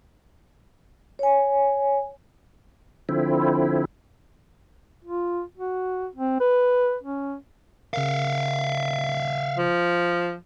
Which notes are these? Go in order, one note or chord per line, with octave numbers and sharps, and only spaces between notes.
C#5 G#5
D3 F3 C4 E4
F4
F#4
C4
B4
C#4
C#3 A#4 E5 F5
F3